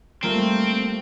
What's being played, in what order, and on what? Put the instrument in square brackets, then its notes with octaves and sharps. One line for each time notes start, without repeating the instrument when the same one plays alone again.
[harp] G3 A#3 F4 [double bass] A3 [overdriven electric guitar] C4